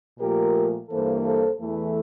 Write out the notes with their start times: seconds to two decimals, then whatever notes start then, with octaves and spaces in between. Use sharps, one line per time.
0.19 A#2 F3 A3 G4 A#4
0.89 G2 E3 A#3 A4 C5
1.24 A4 C5
1.59 E2 E3 A3